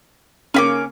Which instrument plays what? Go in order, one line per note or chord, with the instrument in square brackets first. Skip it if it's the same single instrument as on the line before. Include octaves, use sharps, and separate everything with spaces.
[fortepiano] C#3 A#3 [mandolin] C#4 B5 D6